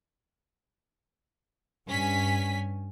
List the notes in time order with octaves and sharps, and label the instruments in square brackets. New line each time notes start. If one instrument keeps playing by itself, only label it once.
[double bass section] G2 [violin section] C#4 G#5 B6